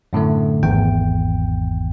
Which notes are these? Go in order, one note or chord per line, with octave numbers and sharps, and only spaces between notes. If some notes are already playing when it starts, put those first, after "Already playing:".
F#2 A2 D3 A3
G#1 E2 G5